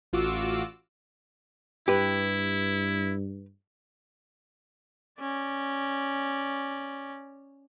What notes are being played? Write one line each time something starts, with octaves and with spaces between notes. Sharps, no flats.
A1 F4 F#4 D6 E6
G2 E4 G4 B4
C#4 D5